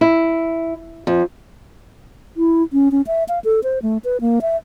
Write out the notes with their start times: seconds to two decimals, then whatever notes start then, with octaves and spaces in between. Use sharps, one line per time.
0.01 E4
1.07 F2
2.37 E4
2.73 C#4
2.92 C#4
3.07 E5
3.28 F5
3.44 A4
3.63 C5
3.82 A3
4.04 B4
4.21 A#3
4.42 E5